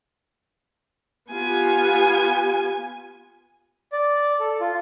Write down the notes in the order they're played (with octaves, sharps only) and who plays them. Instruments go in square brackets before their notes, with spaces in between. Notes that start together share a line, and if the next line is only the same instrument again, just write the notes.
[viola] B3 G#5 [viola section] F4 G4
[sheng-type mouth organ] D5
A4
F4